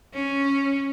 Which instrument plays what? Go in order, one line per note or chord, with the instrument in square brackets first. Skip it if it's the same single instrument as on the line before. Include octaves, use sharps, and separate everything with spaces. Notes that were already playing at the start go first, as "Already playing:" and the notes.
[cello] C#4